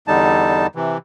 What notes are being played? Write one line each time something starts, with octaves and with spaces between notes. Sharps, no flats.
E2 D3 G3 D#4 A5
C3 E3